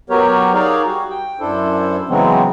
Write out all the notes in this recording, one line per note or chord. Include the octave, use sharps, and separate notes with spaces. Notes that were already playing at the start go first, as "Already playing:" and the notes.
F#3 B3 G4 A#4 C#5
D#4 G#4 A#4 C#5 D5 F5
G3 F#4
G5
F#2 D4 E4 A4 C5
C#3 E3 F#3 G#3 B3 C4